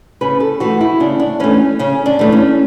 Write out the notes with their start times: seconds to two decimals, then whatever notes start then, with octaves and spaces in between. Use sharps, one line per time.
0.21 C#3 B4
0.40 A4
0.60 E3 A3 F#4
0.81 E4
1.00 C#3 D4
1.20 D4
1.40 E3 A3 C#4
1.79 C#3 C#4
2.06 D4
2.19 E3 A3
2.32 C#4